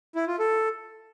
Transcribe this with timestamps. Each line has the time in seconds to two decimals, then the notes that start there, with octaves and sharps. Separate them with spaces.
0.15 E4
0.27 F4
0.39 A4